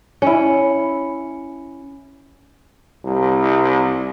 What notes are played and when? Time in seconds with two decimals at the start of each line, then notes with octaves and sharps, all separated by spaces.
0.22 C#4 E4
3.04 C2